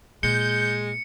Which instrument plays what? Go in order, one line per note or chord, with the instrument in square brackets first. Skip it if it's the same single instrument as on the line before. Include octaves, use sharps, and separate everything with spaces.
[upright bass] A#2 [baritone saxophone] G#3 [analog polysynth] G6 [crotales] C#7